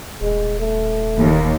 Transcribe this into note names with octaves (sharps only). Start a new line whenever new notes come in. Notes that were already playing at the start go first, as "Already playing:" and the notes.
D#1 G#3
A3
D#2